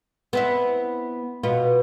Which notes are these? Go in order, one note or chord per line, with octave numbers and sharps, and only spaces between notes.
B3 C4 E4
B2 B3 F4